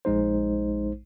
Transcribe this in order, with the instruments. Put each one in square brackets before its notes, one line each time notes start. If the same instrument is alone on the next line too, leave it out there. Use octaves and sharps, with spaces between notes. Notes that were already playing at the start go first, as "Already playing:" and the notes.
[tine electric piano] A#1 G#3 D#4 C5